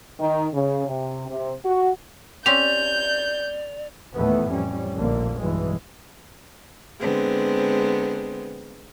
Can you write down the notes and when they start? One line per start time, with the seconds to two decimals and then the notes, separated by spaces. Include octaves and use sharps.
0.19 D#3
0.54 C#3
0.87 C3
1.28 C3
1.65 F#4
2.46 C4 C#4 G4 D5 G6 F7
4.14 D#2 A2 E3 A3 B3
4.50 F2 G3 C#4
4.97 F1 A#1 D3 A#3
5.40 B1 G2 E3 G#3
7.00 D3 G#3 B3 C4